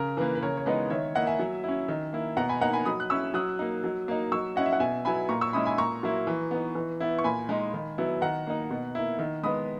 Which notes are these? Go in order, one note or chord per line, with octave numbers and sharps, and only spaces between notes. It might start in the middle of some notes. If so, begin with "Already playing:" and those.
Already playing: C#3 A#4
E3 A#3 B4
B4
C#3 A#4 C#5
C#5
E3 G#3 B3 D#4 B4 D#5
D#3 C#5 E5
A#3 E4 D#5 F#5
E5 G#5
F#3
C#4 E4
D#3
A#3 E4
B2 F#5 A#5
G#5 B5
A#3 D#4 F#5 A#5
G#5 B5
F#3 B5 D#6
F#6
C#4 E4 C#6 E6
F#3 D#6 F#6
A#3 D#4
F#3
A#3 D#4
F#3 C#6 E6
C#4 E4 D#5 F#5
E5
F#5
B2 E5 G#5
F#3 B3 E4 G#5 B5
A#2 A#5 C#6
C#6 E6
G#3 C#4 E4 B5 D#6
G#5 B5
A#2 A#5 C#6
F#3 A#3 E4
E3
B3 D#4
E3
B3 E4
C#6
A#2 G#5 B5
G#3 D#4
D#3
F#3 B3 E4
D#3 F#5 A#5
A#3 D#4
B2
A#3 E4
D#3
G#3 B3 B5 D#6